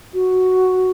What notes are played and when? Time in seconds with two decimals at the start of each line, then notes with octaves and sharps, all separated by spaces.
0.14 F#4